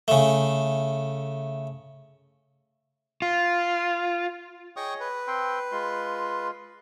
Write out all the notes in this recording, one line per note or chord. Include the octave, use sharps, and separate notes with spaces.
C#3 A3
F4
G#4 C#5 D#5 G5 C#6 D#6
B4
C4 G5 C6
G#3 F4 C6